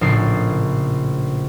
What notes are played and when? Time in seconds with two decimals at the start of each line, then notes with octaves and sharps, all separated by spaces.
0.01 A#1 A2 C#3 D4 C7